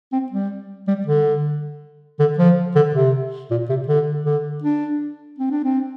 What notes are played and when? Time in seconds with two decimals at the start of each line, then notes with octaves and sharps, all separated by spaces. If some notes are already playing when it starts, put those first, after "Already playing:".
0.13 C4
0.32 G3
0.88 G3
1.06 D3
2.19 D3
2.38 F3
2.75 D3
2.94 C3
3.51 A#2
3.69 C3
3.88 D3
4.25 D3
4.64 D4
5.39 C4
5.50 D4
5.64 C4